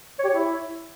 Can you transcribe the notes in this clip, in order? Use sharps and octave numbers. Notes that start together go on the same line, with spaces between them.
C#5
G4
C#5
E4